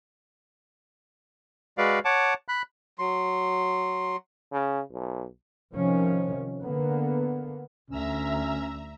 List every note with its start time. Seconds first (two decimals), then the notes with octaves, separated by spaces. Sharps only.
1.78 G#3 F#4 B4 D5 F5
2.05 C#5 F#5 A5 D6
2.48 B5 F#6
2.99 F#3 C6
4.52 C#3
4.92 B1
5.73 C3 D#3 F3 C#4
6.62 D3 A#3 B3
7.90 D2 C#4 E5 A#5 E6